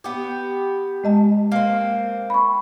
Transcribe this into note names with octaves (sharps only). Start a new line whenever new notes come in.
B3 G4
G#3 D#5 A5
A#3 C4
B5 C#6